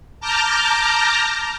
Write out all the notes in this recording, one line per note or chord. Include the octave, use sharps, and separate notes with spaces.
A5 A#5 D6 F6 G6 A#6